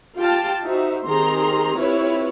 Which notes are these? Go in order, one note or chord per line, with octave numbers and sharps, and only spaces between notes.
F4 G4 F5 G5 A5
D#4 F#4 C5 E5
D#3 C4 G4 G#4 A#5 C6
C4 E4 F4 G4 B4 C#5